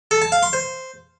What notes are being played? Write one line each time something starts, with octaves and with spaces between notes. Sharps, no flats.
A4
A5
F5
C6
C5